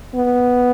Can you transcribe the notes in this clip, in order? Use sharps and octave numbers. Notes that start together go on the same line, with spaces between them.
B3